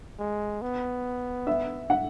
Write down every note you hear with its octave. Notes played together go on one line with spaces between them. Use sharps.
G#3
B3
E5
F#5